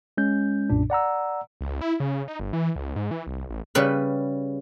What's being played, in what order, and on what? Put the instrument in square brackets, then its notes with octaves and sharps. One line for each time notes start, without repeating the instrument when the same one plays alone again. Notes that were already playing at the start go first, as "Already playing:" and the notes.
[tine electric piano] G#3 C#4 G6
B1 F#2 A#2 D4
D5 F#5 A#5 E6
[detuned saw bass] C#2
E4
C#3
D#4
G1
E3
C#2
G#2
E3
C2
A1
[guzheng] C#3 G3 B4